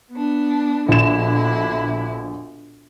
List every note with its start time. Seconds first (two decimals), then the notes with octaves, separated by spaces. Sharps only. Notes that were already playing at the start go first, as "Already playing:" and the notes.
0.13 B3 D4
0.88 A#1 B2 D3 E4 E7